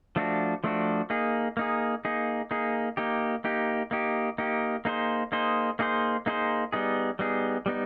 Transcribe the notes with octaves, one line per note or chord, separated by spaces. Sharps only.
F3 A3 D4 F#4
F3 A3 D4 F#4
A#3 D#4 G#4
A#3 D#4 G#4
A#3 D#4 G#4
A#3 D#4 G#4
A#3 D#4 G4
A#3 D#4 G4
A#3 D#4 G4
A#3 D#4 G4
A#3 D#4 G#4 C5
A#3 D#4 G#4 C5
A#3 D#4 G#4 C5
A#3 D#4 G#4 C5
G3 B3 D#4 G#4
G3 B3 D#4 G#4
G3 B3 D#4